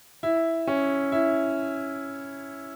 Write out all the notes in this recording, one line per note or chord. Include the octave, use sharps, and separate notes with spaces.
E4
C#4
E4